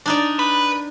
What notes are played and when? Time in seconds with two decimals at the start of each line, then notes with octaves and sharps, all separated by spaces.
0.06 D4 D#4 D5
0.39 B4